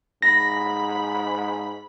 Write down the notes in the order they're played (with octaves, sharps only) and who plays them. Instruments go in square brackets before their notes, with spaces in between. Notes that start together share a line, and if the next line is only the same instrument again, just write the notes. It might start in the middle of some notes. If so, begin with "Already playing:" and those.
[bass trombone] G#2 [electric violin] B5 [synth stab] A#6